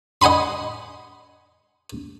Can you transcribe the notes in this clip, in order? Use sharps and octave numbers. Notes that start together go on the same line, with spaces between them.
D#5 F#5 G#5 B5 C6